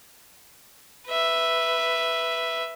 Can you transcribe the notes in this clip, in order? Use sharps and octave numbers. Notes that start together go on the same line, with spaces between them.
B4 E5